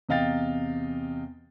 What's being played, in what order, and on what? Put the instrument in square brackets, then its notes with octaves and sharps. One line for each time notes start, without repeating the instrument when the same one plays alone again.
[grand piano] E2 C3 D#5 F5 G5 A6